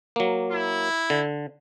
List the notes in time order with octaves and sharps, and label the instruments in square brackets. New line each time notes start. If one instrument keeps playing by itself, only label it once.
[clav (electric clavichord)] F#3 A#3
[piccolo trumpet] E4
[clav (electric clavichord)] D3